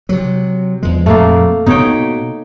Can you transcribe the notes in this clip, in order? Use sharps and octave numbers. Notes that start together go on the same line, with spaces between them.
C3 F#3
E2 F3 G#3
F2 A#2 A3 A#3
B2 B3 D#4 C#5 G5